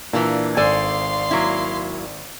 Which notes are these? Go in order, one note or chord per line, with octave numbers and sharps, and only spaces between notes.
A#2 E3 A#3 D4
G#1 A4 C5 D5 F5 G#5 C6 A6
F#3 A#3 E4